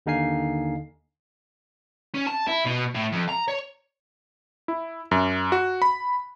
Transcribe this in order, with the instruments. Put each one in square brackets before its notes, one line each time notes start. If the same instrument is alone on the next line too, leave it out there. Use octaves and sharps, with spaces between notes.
[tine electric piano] D#2 D3 D#4 F5 G#5 C7
[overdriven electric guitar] C#4
A5
E4
B2
A2
F2
A#5
C#5
[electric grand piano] E4
F#2
F#4
B5